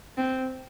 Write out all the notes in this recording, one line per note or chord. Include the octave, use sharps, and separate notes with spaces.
C4